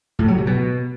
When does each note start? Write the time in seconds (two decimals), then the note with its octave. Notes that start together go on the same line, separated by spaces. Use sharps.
0.19 A2
0.28 F#3
0.37 C3
0.47 B2